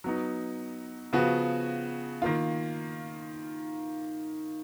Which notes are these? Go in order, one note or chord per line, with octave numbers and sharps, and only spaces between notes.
F#3 B3 D#4
C#3 F3 B3 F#4
D#3 A#3 F4